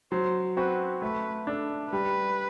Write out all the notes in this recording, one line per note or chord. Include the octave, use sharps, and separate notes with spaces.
F#3 C5
C4 F#4 B4
A3 B4
D4 A4
G3 B4